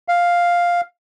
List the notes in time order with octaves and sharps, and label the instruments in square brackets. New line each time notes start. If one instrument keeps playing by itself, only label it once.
[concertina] F5